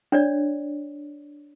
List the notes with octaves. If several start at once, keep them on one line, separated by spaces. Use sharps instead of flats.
D4 C#5 D5